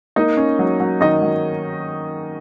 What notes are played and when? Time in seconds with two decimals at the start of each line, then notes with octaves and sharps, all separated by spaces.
0.16 A#3 D#4 D#5
0.37 C#4
0.59 F#3
0.80 F#3
1.01 D#3 D#4 D#5
1.22 F#3